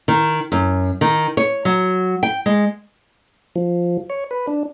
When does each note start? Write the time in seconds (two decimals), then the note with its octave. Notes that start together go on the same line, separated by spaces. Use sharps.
0.08 D#3
0.52 F#2
1.01 D#3
1.37 C#5
1.65 F#3
2.23 G5
2.46 G#3
3.56 F3
4.10 C#5
4.31 B4
4.47 D4